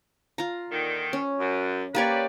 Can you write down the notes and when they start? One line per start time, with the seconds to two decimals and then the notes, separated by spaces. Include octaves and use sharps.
0.38 F4 A#5
0.70 A#2 D3 D#3
1.13 C#4
1.39 F#2
1.95 A#3 G4 B4 C#5 D5